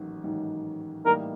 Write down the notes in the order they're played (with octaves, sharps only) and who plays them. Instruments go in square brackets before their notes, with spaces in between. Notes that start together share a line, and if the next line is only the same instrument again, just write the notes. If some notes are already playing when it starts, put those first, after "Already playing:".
Already playing: [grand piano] A1 G#2 D#3 F#3
A1 G#2 D#3 F#3
[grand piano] A2 E3 G3 A#3 D#4 [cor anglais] A#4